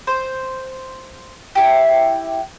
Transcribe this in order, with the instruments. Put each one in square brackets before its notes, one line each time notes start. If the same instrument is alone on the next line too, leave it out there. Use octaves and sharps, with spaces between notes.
[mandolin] C5
E4 G4